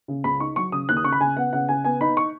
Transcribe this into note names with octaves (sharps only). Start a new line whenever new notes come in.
C#3
C#2 B5
D#4 C#6
F#3 C#6
C#3 D#6
D#2 F#6
D#6
C#3 C#6
B5
C#3 G#5
B3 F#5
C#3 F#5
C#3 G#5
B3 G#5
D#4 B5
C#6